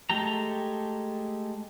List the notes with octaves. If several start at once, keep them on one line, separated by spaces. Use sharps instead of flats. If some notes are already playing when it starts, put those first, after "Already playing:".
G#3 A3 G4 A4 A#5